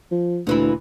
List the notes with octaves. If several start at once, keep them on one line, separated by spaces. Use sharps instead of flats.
F3
D2 A#2 E3 E4